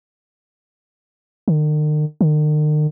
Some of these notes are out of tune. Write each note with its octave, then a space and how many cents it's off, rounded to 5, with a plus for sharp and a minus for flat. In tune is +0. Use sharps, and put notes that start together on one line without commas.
D#3 -45
D#3 -45